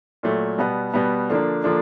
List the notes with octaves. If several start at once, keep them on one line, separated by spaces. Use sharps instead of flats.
A#2 F#3 A3
B2 G3 B3
B2 G3 B3
D3 F3 A#3 D4
D3 F3 A#3 D4